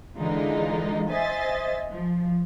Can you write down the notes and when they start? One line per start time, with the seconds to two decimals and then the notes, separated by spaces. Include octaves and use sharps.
0.18 D3 E3 G#3 D#4 F4
1.10 C5 D#5 E5 G#5 A6
1.91 F3